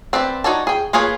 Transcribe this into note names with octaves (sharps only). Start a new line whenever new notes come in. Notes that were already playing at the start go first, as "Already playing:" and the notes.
C4 B4 C5 D5 E5
D#4 F#4 C#5 D5 A5
G#4 G5
A#3 F4 G#4 B4 C#5